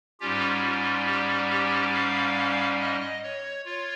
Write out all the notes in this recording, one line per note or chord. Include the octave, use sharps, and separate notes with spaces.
G#2 G3 C#4 F4 G4
F4
G4
G4
F5
D#5
C#5
F4 C#5